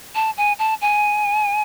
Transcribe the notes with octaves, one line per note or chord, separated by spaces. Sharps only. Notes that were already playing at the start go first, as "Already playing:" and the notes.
A5
G#5
A5
G#5